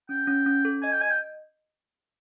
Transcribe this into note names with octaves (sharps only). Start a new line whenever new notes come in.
C#4 G5
C#4
C#4
A4
D#5 G#5
G5
D#5 G#5
G5